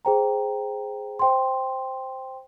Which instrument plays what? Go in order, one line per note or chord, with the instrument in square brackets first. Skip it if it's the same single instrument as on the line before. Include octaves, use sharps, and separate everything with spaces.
[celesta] G#4 C5 G5 A#5
C5 G5 C6